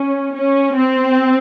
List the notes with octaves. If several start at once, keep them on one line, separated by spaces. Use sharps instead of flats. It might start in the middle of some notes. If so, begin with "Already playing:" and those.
Already playing: C#4
C#4
C4